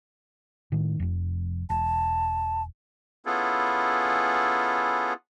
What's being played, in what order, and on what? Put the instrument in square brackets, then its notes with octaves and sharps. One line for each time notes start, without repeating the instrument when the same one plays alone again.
[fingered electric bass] A2 D#3
F1 F2
[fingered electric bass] E1 [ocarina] A5
[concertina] B3 C#4 E4 F4 G#4 A4